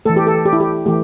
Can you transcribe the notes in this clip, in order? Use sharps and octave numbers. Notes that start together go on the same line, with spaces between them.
E3 A3 A4
G4
A4
G4
E4
G4
E3 A3 G4